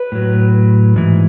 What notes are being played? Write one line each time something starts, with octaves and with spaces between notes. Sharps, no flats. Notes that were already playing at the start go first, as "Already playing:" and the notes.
Already playing: B4
A2 F#3
G#2 E3